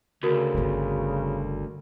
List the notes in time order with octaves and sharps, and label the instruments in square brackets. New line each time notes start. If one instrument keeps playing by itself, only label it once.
[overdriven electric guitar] D2 [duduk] C#3 [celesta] F#4 A#4
[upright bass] G1 G3